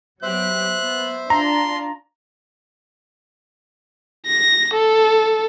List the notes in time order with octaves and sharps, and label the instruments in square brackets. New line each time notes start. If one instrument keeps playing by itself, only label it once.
[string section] F#3 B3 G4 [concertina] C5 E5 [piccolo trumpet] F#6
[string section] B3
[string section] D4 F4 [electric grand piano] A#5 [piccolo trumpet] C6
[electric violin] A#6
A4